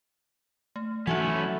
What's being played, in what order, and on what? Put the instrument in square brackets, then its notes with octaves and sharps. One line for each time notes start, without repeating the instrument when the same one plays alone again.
[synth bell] A3
[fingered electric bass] E3 F#3 [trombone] A3 [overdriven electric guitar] C#4 E4 [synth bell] D#4 F#4 F#5